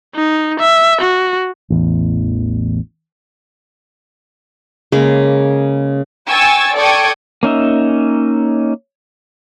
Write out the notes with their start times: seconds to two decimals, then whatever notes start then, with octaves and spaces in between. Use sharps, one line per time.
0.15 D#4
0.59 E5
1.01 F#4
1.70 A1 E2
4.92 C#3 G#3 A#3 B5
6.28 G5 G#5 C#6 E6 G#6 A6
6.77 A4 D5 G5 C#6 D#6 G#6
7.43 A#3 C#4 D#4 E5